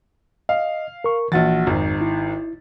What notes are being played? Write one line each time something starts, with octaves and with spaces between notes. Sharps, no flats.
D#5 F5
A#4 C#6
A#1 E3 F#4 A6
G#1 F2 G#2
E4